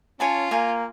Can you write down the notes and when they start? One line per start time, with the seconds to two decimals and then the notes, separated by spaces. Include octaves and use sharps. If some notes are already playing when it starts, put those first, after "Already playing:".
0.20 C#4 F4 C#5 G#5 A5
0.51 A#3 G#5 A#5